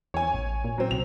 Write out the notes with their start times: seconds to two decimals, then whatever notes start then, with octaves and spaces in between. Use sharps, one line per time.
0.14 E2 C#5 G#5
0.33 A1
0.64 A#2
0.78 F#3 C4
0.91 C2 F7